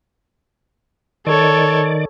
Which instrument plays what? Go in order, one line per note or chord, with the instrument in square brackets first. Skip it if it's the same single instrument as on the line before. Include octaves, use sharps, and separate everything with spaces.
[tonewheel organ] D#3 D5 [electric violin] A4 C#5